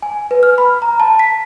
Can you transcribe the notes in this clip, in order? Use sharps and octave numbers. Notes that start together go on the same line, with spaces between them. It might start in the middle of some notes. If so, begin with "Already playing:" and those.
G#5
B4
F6
B5
A#5
A5
B6